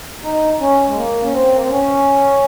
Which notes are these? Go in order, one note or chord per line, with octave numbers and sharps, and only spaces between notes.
D#4
C#4
G#3
A#3
C#4
C4
A#3
C4
C#4